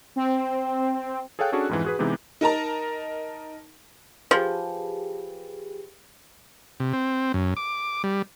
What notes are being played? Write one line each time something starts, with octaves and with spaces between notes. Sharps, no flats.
C4
G#4 A4 C#5 F5 G5 F#6
C#4 D4 F#4 G#4 A4
F2 G#2 E3
F#4 G#4 B4
C3 E3 G#3 B3 D#4 G4
D#4 A#4 A5 A#5
F3 G4 G#4 B4
C3
C4
F#2
D6
G3